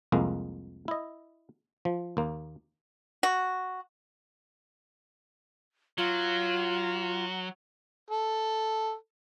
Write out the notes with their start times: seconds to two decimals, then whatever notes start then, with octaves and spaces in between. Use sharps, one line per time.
0.12 C2 F2 G#3 A#3
0.88 E4 D#5
1.85 F3
2.17 D#2 A#3
3.23 F#4
5.98 F#3 F4
8.10 A4